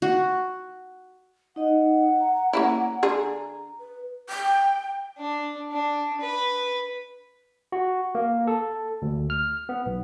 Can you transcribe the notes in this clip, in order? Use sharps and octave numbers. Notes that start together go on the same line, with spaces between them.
F#4
D#4 D#5 F#5
A#5
A#3 C#4 E4
D3 G#4
B4
G5
D4
D4
B4
F#4
A#3
A4
D2
F6
B3
B1